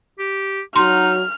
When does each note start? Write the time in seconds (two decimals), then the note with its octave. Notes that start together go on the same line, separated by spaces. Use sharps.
0.19 G4
0.76 F#3 D#4 F#4 C6 F6